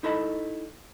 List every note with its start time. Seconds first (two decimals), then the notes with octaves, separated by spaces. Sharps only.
0.03 D#4 E4 A4 D#5 A#5 B5